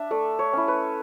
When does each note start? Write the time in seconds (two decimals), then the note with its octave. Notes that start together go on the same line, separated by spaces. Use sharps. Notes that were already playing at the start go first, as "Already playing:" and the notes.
Already playing: D4 E5
0.11 A3 D5
0.39 C#5
0.53 C#4 E4
0.68 B4